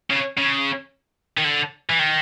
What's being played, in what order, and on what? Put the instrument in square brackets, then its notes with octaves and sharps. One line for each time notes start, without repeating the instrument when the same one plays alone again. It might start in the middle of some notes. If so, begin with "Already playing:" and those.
[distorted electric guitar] C#3
C#3
D#3
D3
E3
D#3